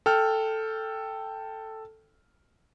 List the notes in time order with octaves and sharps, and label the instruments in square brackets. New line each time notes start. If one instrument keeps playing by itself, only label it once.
[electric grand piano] A4 G5 F6